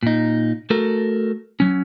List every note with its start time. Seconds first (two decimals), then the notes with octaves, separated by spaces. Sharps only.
0.03 A#2 D#4
0.70 A3 F#4 A4 A#4
1.60 F#3 C#4